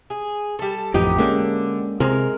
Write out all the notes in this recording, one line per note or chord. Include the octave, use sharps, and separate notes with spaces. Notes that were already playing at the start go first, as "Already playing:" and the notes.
G#4
G3 A4
A1 F2 B3 D#4 G4 G5
D3 G#3 A#3 C#4
C3 G#3 A#4